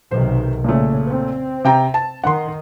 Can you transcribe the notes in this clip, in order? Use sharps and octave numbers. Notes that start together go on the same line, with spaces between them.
B1 C3 D#3 C5
A#2 C#3 A3
C4
C3 G5 A#5
A5
D#3 F#5 C6